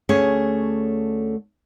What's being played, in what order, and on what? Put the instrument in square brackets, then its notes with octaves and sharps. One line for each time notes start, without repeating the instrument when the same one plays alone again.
[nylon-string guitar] D2 A3 C#4 G#4 C#5